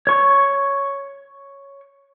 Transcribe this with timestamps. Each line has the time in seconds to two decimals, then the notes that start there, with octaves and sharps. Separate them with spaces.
0.07 C#5 C#6